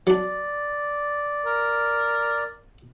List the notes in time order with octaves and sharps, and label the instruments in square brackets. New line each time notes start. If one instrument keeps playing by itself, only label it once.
[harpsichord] F#3 D4 [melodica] D5
[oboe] A#4